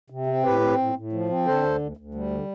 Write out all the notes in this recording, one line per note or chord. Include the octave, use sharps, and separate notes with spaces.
C3
C4
A2 G4 B4
C4
A2
A2
F3
C4
D3 A4 C5
D2
D2
D2
G3
D3